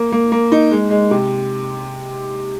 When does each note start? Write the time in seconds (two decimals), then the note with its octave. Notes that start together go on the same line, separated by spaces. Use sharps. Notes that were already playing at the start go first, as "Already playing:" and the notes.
Already playing: A#3
0.12 A#3
0.32 A#3
0.52 D#4
0.71 G#3
0.90 G#3
1.11 C3